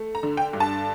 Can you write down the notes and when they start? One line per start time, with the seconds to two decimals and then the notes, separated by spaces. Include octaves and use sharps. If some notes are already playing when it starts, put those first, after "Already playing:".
Already playing: A3
0.15 A#5
0.23 D3
0.37 G5
0.53 G2
0.60 A5